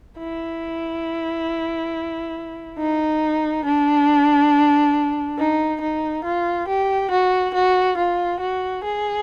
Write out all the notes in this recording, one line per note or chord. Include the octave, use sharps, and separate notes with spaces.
E4
D#4
D4
D#4
D#4
F4
G4
F#4
F#4
F4
F#4
G#4